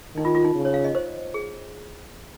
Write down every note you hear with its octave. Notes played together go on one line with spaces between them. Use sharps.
D#3 D#4
F4
F4
D#4
C#3
C#5
F5
D#5
C5
G#4